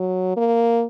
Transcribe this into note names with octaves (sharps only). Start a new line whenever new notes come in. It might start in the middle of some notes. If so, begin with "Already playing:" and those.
Already playing: F#3
A#3